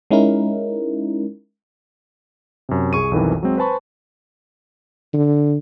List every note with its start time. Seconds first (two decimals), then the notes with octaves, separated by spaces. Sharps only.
0.11 G#3 C#4 D#4 E4 A#4
2.69 F#2 C3
2.93 C2 G#4 C#6 D#7
3.11 B1 F2 D#3 E3
3.43 F#3 G#3 C4
3.57 B4 C5 G#5 A5 B5 C#6
5.14 D3